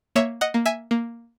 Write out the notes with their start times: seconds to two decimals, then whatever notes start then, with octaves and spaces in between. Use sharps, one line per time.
0.15 A#3 C#5 E5
0.41 D#5 F#5
0.54 A#3
0.66 E5 G#5
0.91 A#3